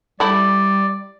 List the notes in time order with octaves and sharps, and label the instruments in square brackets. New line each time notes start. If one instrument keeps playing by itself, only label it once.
[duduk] G3 [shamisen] A3 E4 [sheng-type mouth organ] D5